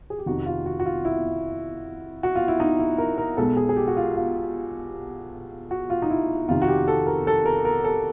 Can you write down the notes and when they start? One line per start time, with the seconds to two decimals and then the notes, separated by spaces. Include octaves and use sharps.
0.10 G#4
0.18 G4
0.26 F2 C3 D#3 F#4
0.46 F4
0.66 F#4
0.80 F#4
0.86 F4
1.05 E4
2.23 F#4
2.35 F4
2.48 E4
2.60 D#4
2.79 E4
2.98 A#4
3.18 A#4
3.37 B1 B2 G#3 A4
3.57 G#4
3.69 G#4
3.76 G4
3.88 F#4
3.97 F4
4.16 F4
5.71 F#4
5.90 F4
6.02 D#4
6.10 E4
6.48 F2 C3 D#3 F4
6.62 F#4
6.68 G4
6.88 A4
7.07 A#4
7.27 A4
7.45 A#4
7.65 A#4
7.84 A4